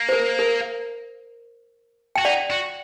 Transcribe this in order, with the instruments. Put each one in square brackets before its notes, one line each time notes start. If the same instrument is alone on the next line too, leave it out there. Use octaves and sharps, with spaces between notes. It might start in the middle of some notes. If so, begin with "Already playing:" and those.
Already playing: [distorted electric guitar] A#3
[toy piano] C5
A#4
A#4
[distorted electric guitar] F#4 [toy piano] G5
[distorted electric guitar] D#4 [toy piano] D5 F#5
[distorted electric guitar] F#4